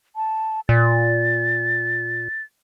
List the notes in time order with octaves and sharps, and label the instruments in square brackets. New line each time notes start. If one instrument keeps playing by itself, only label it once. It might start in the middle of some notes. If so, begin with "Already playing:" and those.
[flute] A5
[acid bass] A#2 [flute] A6